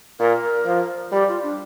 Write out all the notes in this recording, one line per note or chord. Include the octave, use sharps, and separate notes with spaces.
A#2 A#4
F3
G3 G4
F4
D4